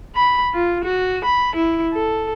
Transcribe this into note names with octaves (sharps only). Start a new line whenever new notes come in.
B5
F4
F#4
B5
E4
A4